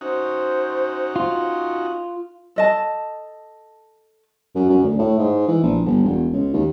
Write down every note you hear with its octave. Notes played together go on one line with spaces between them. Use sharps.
C#4 D#4 F#4 C5
F4
A4 D#5 A5
F#2
F#2
D2
A2
G#2
E3
A#1
G1
E1
C#2
D#2